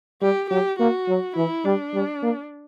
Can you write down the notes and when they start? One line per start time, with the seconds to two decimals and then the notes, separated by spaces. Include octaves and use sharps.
0.22 G3 G4
0.50 F#3 G4
0.79 A#3 F#4
1.08 F#3
1.36 E3 E4
1.65 G3 D4
1.94 G3
2.22 A#3